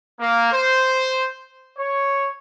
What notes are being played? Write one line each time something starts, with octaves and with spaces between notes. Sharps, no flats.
A#3
C5
C#5